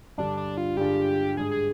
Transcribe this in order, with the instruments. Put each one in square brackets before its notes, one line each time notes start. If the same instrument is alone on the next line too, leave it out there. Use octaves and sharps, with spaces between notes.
[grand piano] G2 D3 G3 [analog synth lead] D4
[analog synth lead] D4
F4
[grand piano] G2 D3 G#3 D4 F4 [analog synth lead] G4
[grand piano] G#2 G3 D4 [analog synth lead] G#4
[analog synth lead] G#4